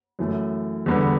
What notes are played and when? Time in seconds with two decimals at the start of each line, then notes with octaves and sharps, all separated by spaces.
0.19 F#2 E3 A3
0.86 E2 D3 G3 B3